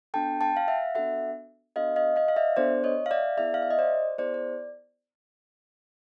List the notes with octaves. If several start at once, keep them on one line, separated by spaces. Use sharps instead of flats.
B3 D4 F#4 A4 G5 A5
G5 A5
F5
E5 F#5
B3 D4 F#4 A4 E5 F#5
B3 D4 F#4 A4 D#5 F5
D#5 F5
D#5 F5
F5
D5 E5
B3 D4 F#4 A4 C5 D5
C#5 D#5
F5
D5 E5
B3 E4 G#4 D5 E5
F5
E5
D#5
C5 D5
B3 E4 G#4 C5 D5
D5